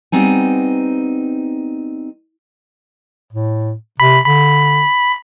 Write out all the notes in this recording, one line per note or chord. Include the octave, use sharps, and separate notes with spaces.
G3 B3 C4 D#4 G#5
A2
C3 B5
D3 B5